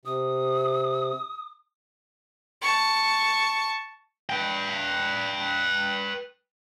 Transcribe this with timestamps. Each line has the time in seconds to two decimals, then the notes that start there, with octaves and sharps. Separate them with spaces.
0.05 C3 D#6
2.61 A5 C#6
4.30 B4 G5